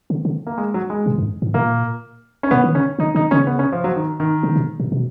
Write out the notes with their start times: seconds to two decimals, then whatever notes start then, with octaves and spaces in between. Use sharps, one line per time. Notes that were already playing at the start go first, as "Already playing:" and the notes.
0.10 C#3
0.25 C#3
0.47 A#3
0.58 G#3
0.74 F#3
0.90 G#3
1.06 A#2
1.18 F#2
1.42 G#2
1.54 A#2 A#3
2.43 C#4
2.51 B2 B3
2.64 D#3
2.75 C#3 C#4
2.99 C#3 D#4
3.15 C#3 D#4
3.31 C#3 C#4
3.47 B3
3.59 C#4
3.72 F3
3.84 F#3
3.96 D#3
4.20 D#3
4.43 C#3
4.56 B2
4.80 A#2
4.92 B2